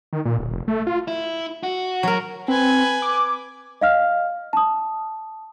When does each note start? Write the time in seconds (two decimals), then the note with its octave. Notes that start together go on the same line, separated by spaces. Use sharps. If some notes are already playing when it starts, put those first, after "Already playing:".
0.13 D#3
0.25 A#2
0.38 D1
0.51 F1
0.68 A3
0.87 F4
1.08 E4
1.63 F#4
2.03 F#3 A#4
2.48 C4 B4 G#5
3.02 D6
3.81 D#5 F5 F6
4.53 A5 D#6